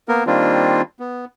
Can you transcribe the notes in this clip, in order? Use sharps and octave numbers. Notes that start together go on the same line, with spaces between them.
A#3 B3 A#4
D#3 G3 A#3 C4 D4 F4
B3